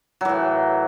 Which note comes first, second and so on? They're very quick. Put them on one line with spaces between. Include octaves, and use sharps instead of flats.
F#3 E3 A2